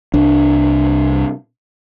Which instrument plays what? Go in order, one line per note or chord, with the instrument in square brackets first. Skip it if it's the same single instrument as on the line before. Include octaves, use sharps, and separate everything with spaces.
[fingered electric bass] C2 D4